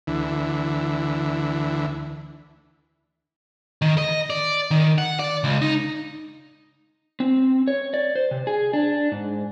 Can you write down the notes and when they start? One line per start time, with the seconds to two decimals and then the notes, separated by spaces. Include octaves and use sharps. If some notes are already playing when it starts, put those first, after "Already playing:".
0.07 D2 E3
3.82 D#3
3.98 D#5
4.30 D5
4.71 D#3
4.98 F#5
5.19 D5
5.44 C#2
5.62 D#4
7.20 C4
7.68 C#5
7.94 D5
8.15 C5
8.31 C3
8.47 G#4
8.73 D4
9.12 G#2